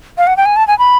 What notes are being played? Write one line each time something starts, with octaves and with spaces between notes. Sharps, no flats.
F5
F#5
G5
G#5
A5
G#5
B5